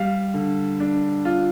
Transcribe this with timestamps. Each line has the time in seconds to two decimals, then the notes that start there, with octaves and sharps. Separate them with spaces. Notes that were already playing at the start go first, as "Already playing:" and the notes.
Already playing: G3 F5
0.34 D3
0.80 D4
1.25 F4